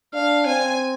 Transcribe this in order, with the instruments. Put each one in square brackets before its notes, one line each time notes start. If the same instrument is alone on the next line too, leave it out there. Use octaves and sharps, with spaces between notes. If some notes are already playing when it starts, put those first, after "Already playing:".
[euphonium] D4 [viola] F5
[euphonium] C4 [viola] G#5